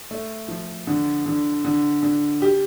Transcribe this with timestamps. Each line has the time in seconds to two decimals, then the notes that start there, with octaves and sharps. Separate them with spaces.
0.11 A3
0.48 F3
0.87 D3
1.26 D3
1.65 D3
2.03 D3
2.42 G4